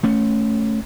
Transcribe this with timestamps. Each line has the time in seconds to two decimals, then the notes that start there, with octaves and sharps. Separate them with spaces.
0.03 A3 C#4